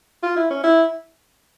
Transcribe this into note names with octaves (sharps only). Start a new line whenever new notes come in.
F4
E4
C#4
E4